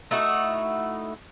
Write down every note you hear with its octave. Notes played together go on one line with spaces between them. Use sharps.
A3 D#4 E4 F#4